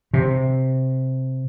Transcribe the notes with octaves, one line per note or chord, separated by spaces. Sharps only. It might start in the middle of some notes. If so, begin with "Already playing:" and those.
C3